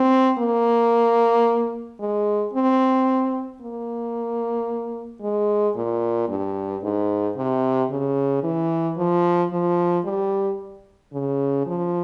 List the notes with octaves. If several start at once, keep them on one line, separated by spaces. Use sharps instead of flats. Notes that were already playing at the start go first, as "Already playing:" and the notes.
Already playing: C4
A#3
G#3
C4
A#3
G#3
A#2
G2
G#2
C3
C#3
E3
F3
F3
G3
C#3
F3